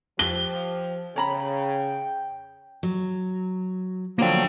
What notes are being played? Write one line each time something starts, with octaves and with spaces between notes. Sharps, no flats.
F3 G4 G7
C#3 C#5 G5 A#5 B5
F#3
D3 F3 F#3 A#3 G5